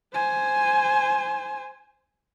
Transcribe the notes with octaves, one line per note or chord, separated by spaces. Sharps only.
C5 G#5